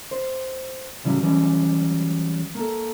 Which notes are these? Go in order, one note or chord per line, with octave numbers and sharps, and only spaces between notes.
C5
A2 C#3 E3 F#3 G3
E3 F#3 G3 C#4
A#3 A4